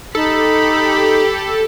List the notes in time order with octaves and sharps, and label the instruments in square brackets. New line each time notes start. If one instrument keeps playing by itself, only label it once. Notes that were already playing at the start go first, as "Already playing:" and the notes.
[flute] D#4 [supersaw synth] G4 [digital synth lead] A4 [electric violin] B5